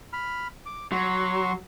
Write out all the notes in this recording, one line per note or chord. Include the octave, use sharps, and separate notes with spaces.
B5 F6
D6
F#3 C6 C#6